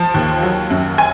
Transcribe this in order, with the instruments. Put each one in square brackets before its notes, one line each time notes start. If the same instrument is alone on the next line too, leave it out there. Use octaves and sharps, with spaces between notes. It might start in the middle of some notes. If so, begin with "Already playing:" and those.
Already playing: [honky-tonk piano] F3 A5
D#2
F#3
F#2
G#5